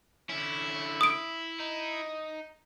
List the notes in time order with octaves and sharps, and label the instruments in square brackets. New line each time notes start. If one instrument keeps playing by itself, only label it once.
[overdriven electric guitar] D3 C#4 [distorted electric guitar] E4
[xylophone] D#6 D7
[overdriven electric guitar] D#4